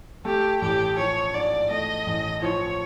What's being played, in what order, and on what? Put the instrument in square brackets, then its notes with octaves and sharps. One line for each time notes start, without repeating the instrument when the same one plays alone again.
[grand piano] A3 [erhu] G4
[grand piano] A1 [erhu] G4
[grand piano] F3 [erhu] C#5
[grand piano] G#2 [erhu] D5
[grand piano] A3 [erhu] D#5
[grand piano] A1
[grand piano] F3 [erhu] C#5